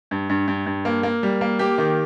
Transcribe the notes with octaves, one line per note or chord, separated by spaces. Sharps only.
G2
G2
G2
G2
A#3
A#3
G3
A#3
A#3 G4
D#3